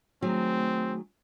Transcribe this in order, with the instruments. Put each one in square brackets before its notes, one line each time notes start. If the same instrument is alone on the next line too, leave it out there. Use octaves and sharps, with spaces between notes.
[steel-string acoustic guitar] D#3 F#3 G#4 [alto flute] A3 [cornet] C4